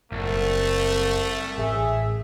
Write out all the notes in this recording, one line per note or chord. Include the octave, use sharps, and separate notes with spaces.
F#1 C2 A3
A1 G#4 E5